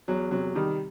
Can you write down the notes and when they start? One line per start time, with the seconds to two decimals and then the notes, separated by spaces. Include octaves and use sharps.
0.08 E2 F#3
0.31 C3 F#3
0.55 D#3 G3